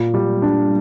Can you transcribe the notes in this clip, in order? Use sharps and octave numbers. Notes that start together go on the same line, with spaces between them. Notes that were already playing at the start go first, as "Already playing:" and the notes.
Already playing: A#2
G3
D4